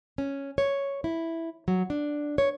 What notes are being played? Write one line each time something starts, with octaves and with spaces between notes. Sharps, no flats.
C#4
C#5
E4
F#3
D4
C#5